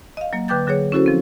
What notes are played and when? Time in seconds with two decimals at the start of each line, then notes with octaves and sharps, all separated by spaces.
0.17 D#5 F5
0.33 F#3 A#3
0.48 D3 B4 G5 D6 G6 A6
0.67 D3 F#3 G#4 C#5
0.92 C#4 E4 F#4 A4 C5
1.06 F3 C4